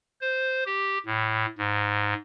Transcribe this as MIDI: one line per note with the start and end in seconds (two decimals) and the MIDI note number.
0.21 0.64 72
0.66 0.98 67
1.06 1.46 45
1.58 2.14 44